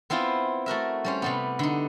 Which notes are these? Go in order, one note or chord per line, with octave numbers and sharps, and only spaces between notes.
B3 C4 E4 F4 C5
A3 F#4 A#4 E5
G3 C#4 C5
C3 G3 B3
D3 D#4